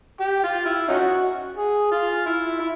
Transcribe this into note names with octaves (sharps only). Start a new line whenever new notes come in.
G4
F4
E4
C#4 D#4 F#4
G#4
F4
E4
E4